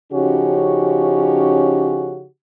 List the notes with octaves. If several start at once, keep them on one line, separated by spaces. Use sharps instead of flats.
C#3 F3 C#4 D#4 F#4 G4